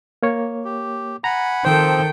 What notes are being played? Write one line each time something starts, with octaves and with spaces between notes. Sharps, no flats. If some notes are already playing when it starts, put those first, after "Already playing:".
A#3 C#5
G4
F#5 G#5 A#5 B5
D#3 F3 C4 A4 C5 G5